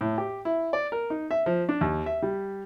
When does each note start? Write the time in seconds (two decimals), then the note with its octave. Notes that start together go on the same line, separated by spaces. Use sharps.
0.01 A2
0.18 G4
0.45 E4
0.73 D5
0.92 A#4
1.10 D#4
1.31 E5
1.46 F3
1.69 D4
1.81 D#2
2.06 E5
2.22 G3